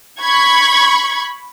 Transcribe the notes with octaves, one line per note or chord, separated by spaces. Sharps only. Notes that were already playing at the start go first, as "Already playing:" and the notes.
B5 C#6 G#6